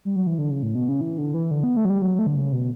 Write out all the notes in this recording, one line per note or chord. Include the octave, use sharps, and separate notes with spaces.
G3
F#3
E3
D3
C#3
A2
B2
C#3
E3
D3
E3
D3
B3
A3
F#3
G3
F#3
A3
D3
C#3
B2